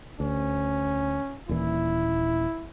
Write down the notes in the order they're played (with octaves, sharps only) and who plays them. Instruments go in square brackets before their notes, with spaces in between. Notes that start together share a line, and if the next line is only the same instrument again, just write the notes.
[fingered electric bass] D2 [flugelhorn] C#4
[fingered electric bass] D#1 A#2 E3 [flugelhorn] E4